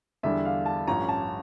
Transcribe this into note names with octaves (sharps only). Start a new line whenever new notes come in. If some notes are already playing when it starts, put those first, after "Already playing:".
E2 D3 G3 D4 E5
F5
A5
A1 G2 F3 C#4 A#5
A5